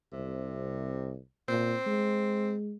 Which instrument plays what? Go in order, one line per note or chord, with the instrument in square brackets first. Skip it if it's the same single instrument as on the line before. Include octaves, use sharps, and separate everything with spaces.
[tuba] C2 [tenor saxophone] C3
[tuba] A#2 [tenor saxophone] C4
[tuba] G#3